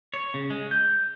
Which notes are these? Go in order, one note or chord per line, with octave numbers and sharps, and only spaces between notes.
C#5
C#3
G#3
G6